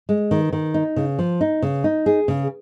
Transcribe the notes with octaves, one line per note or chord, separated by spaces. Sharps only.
G#3
D#3
D#3
D#4
C#3
F3
D#4
C#3
D#4
G#4
C#3